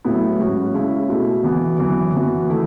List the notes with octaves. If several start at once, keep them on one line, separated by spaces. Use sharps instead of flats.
A2 F#3 B3 E4
G#2 F#3 C#4 F#4
C#3 G#3 C#4 E4
B2 A3 E4
E3 B3 F#4
F#2 E3 B3
E3 B3 F#4
D#3 A3 E4